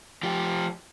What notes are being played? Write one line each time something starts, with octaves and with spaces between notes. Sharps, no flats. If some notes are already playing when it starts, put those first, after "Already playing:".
F3 G4